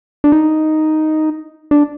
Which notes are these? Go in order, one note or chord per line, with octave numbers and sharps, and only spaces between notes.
D4
D#4
D4